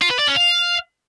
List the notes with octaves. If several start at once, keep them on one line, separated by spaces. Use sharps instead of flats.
F4
B4
D5
C#4
F5